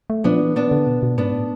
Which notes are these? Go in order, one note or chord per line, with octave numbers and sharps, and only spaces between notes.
A3
F3 B3 D4
E3
B3 D4
D3
B2
B2
G#2 B3 D4
A2